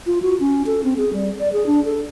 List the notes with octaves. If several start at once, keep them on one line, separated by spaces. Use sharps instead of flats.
F4
F#4
C#4
A4
C4
G#4
G3
D5
G#4
D4
A4